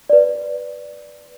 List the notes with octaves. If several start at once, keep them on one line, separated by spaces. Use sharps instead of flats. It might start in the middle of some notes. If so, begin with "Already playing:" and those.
B4 D5